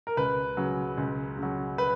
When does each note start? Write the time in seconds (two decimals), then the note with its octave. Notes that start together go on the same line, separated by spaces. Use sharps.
0.07 A#4
0.17 C#2 B4
0.57 C#3 F#3
0.98 C#2
1.39 C#3 F#3
1.78 B4